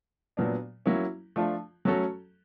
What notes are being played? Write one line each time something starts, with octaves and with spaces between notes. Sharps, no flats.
A#2 F#3 B3 D4
F#3 A#3 C#4 E4
F3 A3 D4 F4
F#3 A3 C#4 F#4 A4